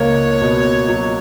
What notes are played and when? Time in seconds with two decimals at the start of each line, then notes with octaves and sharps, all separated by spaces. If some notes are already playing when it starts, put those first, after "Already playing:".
Already playing: C#2 A#3 C#5
0.42 B2
0.88 F#3